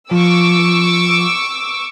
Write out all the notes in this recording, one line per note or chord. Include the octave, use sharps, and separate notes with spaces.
F3 C#6 D6 E6